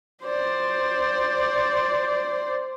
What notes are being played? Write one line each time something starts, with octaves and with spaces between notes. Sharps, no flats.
C5 D5